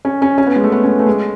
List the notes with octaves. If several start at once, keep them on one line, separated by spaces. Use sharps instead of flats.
C#4
C#4
C#4
B3
G#3
A3
B3
C#4
A3
G#3